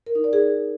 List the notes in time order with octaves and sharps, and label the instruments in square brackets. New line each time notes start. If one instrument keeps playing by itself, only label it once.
[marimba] A#4
D#4
D5
G#4